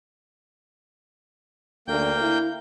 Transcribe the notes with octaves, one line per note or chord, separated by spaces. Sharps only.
D2 A#3 G5 G6
E4